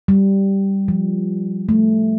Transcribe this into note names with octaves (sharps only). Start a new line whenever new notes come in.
G3
F3
A3